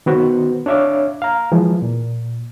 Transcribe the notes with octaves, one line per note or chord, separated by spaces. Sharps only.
D#3 B3 F#4 C5
D4 C#5 E5 F5 D6
F5 A#5
E3 F3 G#3
A#2